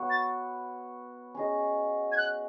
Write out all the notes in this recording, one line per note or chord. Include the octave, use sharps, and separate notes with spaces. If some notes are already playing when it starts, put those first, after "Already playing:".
Already playing: B3 F#4 C#5
A6
C#4 G#4 D#5
G#6
F#6